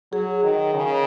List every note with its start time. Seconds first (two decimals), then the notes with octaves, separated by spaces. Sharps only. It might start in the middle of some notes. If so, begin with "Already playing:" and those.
0.12 F#3 G#4
0.43 D#3
0.73 C#3